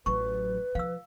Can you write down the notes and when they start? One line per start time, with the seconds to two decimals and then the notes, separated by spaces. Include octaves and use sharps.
0.06 A1 F#3 B4 C#6
0.75 F3 F5 E6